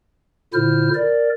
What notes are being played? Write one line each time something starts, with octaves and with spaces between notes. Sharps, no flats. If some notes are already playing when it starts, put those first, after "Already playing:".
A#2 D3 E4 C5 F6
A#4 D5